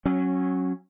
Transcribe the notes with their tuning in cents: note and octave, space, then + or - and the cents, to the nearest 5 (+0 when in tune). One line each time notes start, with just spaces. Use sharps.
F#3 +0 C#4 -20